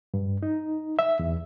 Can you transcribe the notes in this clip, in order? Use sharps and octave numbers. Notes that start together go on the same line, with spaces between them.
G2
D#4
E5
E2